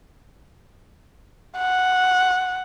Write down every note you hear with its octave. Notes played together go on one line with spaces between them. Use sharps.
F#5